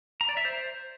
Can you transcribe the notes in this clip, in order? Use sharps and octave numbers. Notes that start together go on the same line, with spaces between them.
A#5
D5
E5
C5